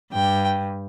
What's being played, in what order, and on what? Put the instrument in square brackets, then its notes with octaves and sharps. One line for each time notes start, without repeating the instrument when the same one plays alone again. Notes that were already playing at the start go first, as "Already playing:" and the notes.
[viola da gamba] G2 [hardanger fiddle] G5